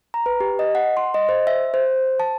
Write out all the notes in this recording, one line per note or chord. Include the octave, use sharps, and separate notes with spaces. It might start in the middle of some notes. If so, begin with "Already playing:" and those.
A#5
B4
G4
D#5
F#5
C6
D#5
C5
E5
C5
A5